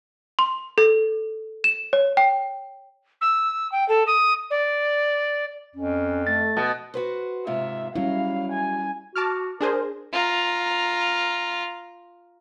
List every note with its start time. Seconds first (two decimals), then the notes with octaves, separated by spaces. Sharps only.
0.39 C6
0.78 A4
1.64 E7
1.93 C#5
2.17 G5
3.21 E6
3.72 G5
3.89 A4
4.07 D#6
4.51 D5
5.75 F2 C#4
6.27 A3 A6
6.57 B2
6.94 F#4 B4 C5
7.47 G#2 C3 F4 E5
7.95 F#3 G3 C#4 E4 F5
8.52 G#5
9.16 F#4 A5 D6 F6
9.61 D4 G#4 A#4 C5
10.13 F4 A#5